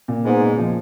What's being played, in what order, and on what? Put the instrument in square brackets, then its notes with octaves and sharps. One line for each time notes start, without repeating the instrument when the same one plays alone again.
[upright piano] A#2
[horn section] G#2 [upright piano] B3
[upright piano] A#2
F3